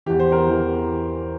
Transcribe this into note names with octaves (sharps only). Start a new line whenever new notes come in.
E2 E3 G4
C5
A#4
E2 E3